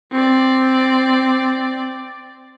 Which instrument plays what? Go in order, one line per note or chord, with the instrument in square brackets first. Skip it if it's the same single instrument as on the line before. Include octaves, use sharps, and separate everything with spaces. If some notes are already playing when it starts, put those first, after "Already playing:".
[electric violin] C4 D5